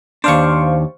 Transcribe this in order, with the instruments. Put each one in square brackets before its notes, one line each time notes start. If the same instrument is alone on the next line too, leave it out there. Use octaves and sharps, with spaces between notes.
[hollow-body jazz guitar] D#2 D4 [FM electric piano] C5 F5 C#6